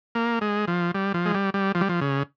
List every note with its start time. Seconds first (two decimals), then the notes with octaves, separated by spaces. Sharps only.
0.15 A#3
0.41 G#3
0.68 F3
0.95 G3
1.14 F3
1.26 G#3
1.34 G3
1.54 G3
1.75 F3
1.81 G3
1.89 F3
2.01 C#3